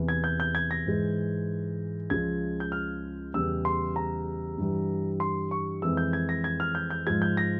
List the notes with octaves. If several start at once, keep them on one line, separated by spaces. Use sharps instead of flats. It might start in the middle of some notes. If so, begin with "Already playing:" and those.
Already playing: E2 C3 E3
G#6
G6
G6
G#6
A#6
G#2 E3 G#3
C#2 C#3 F3 G#3 G#6
G6
F6
E2 C#3 G3 E6
C6
A#5
G2 E3 G3
C6
C#6
F2 E3 G#3 E6
G6
G#6
A#6
G#6
F6
G6
G6
G#2 F3 G#3 G#6
G6
A#6